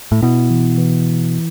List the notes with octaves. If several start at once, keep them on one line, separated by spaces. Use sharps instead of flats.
A2
B2 E4
E3
E3